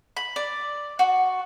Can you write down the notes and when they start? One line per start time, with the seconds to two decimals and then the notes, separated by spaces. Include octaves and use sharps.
0.17 B5
0.36 D5
0.99 F#4